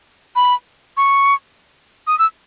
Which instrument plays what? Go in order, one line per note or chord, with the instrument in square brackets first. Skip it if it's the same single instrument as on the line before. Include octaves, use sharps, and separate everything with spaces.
[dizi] B5
C#6
D#6
E6